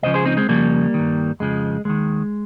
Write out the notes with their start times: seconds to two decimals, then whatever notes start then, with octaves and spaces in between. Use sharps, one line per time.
0.03 C#2 C#3 F3 C5 D#5
0.14 G#4 C5
0.26 C4 D#4
0.37 G#3 C4
0.49 F2 C#3 F3 G3 A#3
0.94 D#3
0.99 G2
1.40 F2 C#3 F3 G#3
1.85 D#2 D#3 G#3